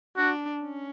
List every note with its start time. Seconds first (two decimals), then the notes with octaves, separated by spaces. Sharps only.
0.17 D4 F#4
0.62 C#4